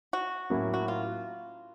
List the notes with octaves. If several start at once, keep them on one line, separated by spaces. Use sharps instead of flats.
F#4
A2 F#3 A#3 C#4 E4
F#4
F4